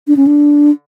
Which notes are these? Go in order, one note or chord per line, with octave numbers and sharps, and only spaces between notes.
D4
C#4
D4